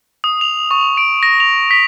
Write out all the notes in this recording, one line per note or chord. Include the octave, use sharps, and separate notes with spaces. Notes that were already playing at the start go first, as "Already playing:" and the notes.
D#6
F7
C#6
D7
A#6
F7
B6